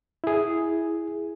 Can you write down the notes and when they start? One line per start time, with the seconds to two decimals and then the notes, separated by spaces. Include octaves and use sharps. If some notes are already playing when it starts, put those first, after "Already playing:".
0.24 E4 G#4